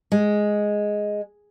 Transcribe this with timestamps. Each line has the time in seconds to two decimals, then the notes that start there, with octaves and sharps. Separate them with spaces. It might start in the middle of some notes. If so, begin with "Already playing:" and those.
0.12 G#3